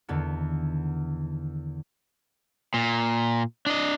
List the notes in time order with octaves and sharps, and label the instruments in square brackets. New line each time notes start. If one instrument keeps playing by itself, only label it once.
[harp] E2 D3 D#3 B3
[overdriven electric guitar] A#2
D4 D#5